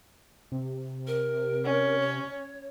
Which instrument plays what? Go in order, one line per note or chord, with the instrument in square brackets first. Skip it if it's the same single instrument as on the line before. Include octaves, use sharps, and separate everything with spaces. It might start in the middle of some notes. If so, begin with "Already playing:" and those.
[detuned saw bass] C3
[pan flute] A#4
[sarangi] C#4
[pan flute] C#5